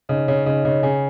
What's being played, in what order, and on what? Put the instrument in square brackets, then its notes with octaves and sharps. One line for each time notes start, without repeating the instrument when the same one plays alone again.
[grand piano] C#3 [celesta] D#4 D#5
[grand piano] C#3 [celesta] C#5
[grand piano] C#3 [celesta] D#4 D#5
[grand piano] C#3 [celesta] D#4 D#5
[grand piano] C#3 [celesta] G#4 G#5